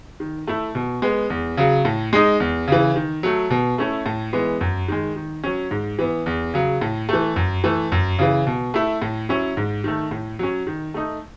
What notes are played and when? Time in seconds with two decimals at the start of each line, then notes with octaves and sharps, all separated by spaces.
0.20 D#3
0.47 A3 E4
0.75 B2
1.02 G#3 B3
1.30 E2
1.57 C#3 F#3
1.85 A2
2.13 G#3 D#4
2.40 E2
2.68 C#3 E3
2.96 D#3
3.23 F#3 A3
3.51 B2
3.78 A3 C#4 E4
4.06 A2
4.33 E3 G#3 B3
4.61 F#2
4.88 D#3 G#3
5.16 D#3
5.44 F#3 C#4
5.71 G#2
5.99 E3 B3
6.26 E2
6.54 C#3 F#3
6.81 A2
7.09 E3 A3
7.36 F#2
7.64 E3 A3
7.92 F#2
8.19 C#3 E3
8.47 B2
8.74 A3 E4
9.02 A2
9.29 F#3 C#4 E4
9.57 G#2
9.84 D#3 A3
10.11 A2
10.39 F#3 C#4
10.67 D#3
10.94 A3 D#4